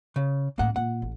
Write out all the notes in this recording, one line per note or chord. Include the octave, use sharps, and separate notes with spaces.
C#3
F#2 A2 A#3 F#5
A#2 F#5
A1